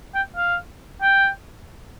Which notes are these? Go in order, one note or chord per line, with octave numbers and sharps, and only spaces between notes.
G5
F5
G5